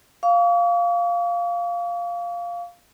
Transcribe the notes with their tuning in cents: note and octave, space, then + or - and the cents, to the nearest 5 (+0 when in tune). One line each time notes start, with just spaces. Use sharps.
F5 +0 C#6 +45